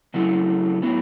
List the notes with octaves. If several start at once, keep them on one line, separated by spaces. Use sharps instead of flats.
C#3 F#3 A3 E4
A2 F#3 B3 E4